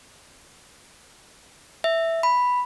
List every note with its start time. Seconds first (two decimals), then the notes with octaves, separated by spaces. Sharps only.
1.84 E5
2.23 B5